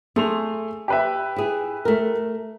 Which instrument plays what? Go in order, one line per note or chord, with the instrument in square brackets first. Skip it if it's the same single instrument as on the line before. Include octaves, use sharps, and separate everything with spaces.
[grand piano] A3 C6 F7 [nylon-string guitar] G#4
[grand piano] G4 B4 E5
[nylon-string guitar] E4 G#4
A3 A#4